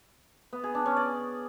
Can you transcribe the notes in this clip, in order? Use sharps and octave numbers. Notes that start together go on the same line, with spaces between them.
B3
G#4
D4
C#4
D5